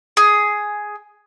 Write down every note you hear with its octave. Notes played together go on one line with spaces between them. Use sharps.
G#4